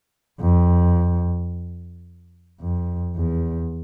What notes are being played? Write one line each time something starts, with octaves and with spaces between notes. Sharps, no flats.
F2
F2
E2